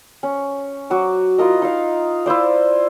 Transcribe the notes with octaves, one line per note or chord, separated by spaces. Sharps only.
C#4
F#3 F#4 D6
E4 F4 A#4 D#5
D#4 F5
E4 F4 C5 D5